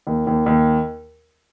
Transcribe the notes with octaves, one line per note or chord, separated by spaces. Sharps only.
D#2
D#2
D#2